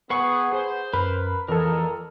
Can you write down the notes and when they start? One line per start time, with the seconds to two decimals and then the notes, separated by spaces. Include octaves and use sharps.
0.10 B3 G#4 B4 F#5 C#6 C7
0.53 G#4 C5
0.93 F#2 A#4 B4 B5
1.48 F2 A#2 E3 G#3 A4 A#4